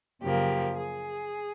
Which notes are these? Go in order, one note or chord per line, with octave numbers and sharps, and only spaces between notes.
F#2 C#3 F3 A#3 G4
G#4